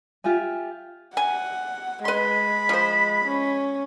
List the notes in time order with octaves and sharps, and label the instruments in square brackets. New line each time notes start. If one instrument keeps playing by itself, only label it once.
[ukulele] F4 G4 E5 G#5
[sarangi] F#5 [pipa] G#5
[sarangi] G#3 [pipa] B4 C6 [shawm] B5
[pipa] F3 C5
[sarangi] C#4